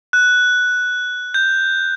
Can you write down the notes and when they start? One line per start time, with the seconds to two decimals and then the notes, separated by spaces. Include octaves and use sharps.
0.13 F#6
1.34 G6